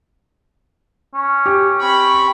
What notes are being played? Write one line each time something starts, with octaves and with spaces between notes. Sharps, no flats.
C#4
G4
C4 B5 C#6